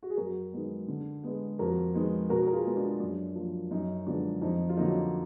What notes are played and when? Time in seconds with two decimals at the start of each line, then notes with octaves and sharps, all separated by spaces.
0.03 F#4
0.10 G#4
0.17 F#2 F#4 A#4
0.53 D#3 G#3 B3
0.88 D3
1.24 G#3 B3
1.59 F2 F#4 A#4
1.94 D#3 G#3 B3
2.29 B2 F#4 A#4
2.47 A#4
2.53 F4 G#4
2.65 G#3 B3
2.76 D4 F4
3.00 F#2 D4
3.35 F3 A#3
3.71 F#2 D#4
4.06 D3 F3 G#3 B3 D4
4.42 F2 D#4
4.69 F4
4.77 D3 F#3 A#3 D#4